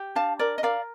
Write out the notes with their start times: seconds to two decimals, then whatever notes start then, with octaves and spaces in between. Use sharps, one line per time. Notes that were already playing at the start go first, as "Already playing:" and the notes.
Already playing: G4
0.15 D4 F5 A5
0.39 A#4 D5
0.58 D#5
0.63 A#4 D5 F5